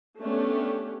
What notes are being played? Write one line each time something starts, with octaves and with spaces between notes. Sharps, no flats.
A3 B3 C#4 D4 G4